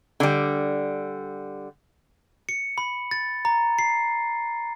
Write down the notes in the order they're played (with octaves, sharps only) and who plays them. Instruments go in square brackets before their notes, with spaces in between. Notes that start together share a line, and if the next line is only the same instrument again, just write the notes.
[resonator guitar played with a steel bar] D3 G3
[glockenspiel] C#7
B5
A6
A#5
C7